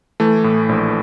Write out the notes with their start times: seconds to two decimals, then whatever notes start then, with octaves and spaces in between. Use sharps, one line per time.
0.20 E3 A3
0.44 A2
0.69 A#1